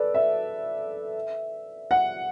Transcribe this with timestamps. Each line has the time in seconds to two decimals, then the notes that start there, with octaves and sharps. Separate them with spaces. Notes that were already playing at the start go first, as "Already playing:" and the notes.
Already playing: A4 B4 D5
0.14 E5
1.91 F#5